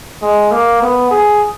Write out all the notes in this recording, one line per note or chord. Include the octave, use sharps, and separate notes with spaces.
G#3
A#3
B3
G#4